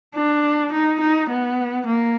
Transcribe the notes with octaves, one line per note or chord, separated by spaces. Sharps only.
D4
D#4
D#4
B3
A#3